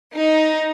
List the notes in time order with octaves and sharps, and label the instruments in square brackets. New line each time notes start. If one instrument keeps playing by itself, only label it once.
[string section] D#4